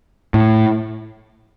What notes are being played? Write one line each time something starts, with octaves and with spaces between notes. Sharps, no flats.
A2